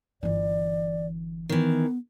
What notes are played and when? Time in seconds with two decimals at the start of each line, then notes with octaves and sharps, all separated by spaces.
0.23 G1 E3 D5
1.49 D#3 E3 B3